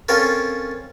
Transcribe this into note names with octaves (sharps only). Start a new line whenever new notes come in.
C4 C#4 F4 A4 A#4